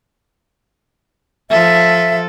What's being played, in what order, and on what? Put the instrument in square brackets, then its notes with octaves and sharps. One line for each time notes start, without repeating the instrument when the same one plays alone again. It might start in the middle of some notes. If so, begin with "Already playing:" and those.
[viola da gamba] F3 A4 [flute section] E5